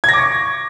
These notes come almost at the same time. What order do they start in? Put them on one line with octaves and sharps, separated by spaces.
G#6 A#6 D6 C#6